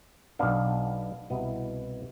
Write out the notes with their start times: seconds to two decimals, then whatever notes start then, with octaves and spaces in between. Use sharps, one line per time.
0.39 B1 B2 B3 D4 F5
1.30 C2 B2 B3 E4